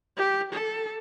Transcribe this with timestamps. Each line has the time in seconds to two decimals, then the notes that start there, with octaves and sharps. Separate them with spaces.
0.17 G4
0.52 A4